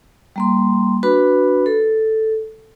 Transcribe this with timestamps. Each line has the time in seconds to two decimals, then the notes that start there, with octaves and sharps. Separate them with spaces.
0.36 G3 A#3 C6
1.03 D4 F#4 B4 B5
1.66 A4